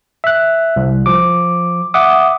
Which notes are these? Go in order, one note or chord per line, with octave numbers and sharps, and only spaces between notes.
E5 F#6
C2
F3 D6
E5 F#5 D6 D#6